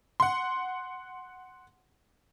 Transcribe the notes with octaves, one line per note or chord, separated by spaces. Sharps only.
F#5 C6